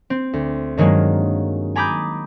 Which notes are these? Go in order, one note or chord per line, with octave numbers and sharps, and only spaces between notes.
C4
D2
G2 D#3 F#3 G#3 A#3
G#5 A#5 B5 D6 D#6 G6